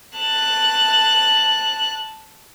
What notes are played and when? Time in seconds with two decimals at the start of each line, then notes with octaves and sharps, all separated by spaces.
0.17 A5 F#6